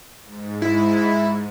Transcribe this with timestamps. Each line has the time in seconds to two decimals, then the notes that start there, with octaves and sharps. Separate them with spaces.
0.23 G#2
0.62 E4